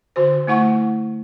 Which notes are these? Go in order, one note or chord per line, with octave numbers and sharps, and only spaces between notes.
D3 F#4 C5
A3 E4 F#5 C#6